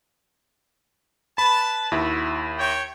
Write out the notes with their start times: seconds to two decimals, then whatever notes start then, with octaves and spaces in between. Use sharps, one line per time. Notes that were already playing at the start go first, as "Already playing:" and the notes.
1.38 B4 A5 B5
1.92 D#2 E4 F#4 E5
2.58 C#5 G5